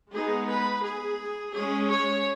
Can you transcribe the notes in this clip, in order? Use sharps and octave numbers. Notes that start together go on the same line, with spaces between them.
G#3 B3 D#4 G#4
B4
G#4
G#3 C#4 G#4
C#5